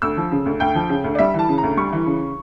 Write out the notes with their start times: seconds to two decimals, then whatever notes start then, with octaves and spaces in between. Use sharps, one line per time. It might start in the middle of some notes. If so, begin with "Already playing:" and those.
0.02 D2 E6
0.17 F3
0.32 C#3
0.46 D2
0.60 D2 G5
0.75 F3
0.89 C#3
1.04 D2
1.15 D5
1.19 G3 E5
1.34 E3 A5
1.49 C#3
1.58 A#5
1.63 D2
1.77 G3 C#6
1.93 E3
2.06 C#3